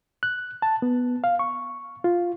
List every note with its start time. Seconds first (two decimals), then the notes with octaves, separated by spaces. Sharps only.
0.23 F#6
0.62 A5
0.82 B3
1.24 F5
1.39 C#6
2.04 F4